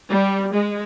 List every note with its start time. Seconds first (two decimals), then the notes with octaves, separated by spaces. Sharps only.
0.11 G3
0.53 G#3